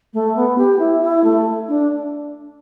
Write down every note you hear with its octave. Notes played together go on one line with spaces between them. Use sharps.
A3
B3
G4
E4
E4
A3
D4